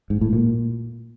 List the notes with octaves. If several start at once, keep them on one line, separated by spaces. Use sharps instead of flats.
G#2
A2
A#2